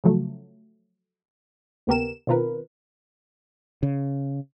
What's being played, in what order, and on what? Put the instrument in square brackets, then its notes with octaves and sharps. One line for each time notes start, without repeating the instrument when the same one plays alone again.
[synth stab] C#3 F3 F#3 A3
D#2 C#3 B3 G4 A#4 E7
B2 D#3 C4 F4 A#4 B4
[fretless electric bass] C#3